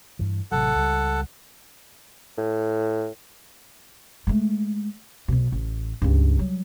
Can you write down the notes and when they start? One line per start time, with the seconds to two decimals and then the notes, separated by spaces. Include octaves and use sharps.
0.19 G2 E3
0.52 A1 C3 F#3 A4 F#5
0.75 C#2 G3
2.37 A2
4.27 G#3 A3
5.28 B1 B2
5.52 A1
6.02 C#2 G2
6.39 F#3 G3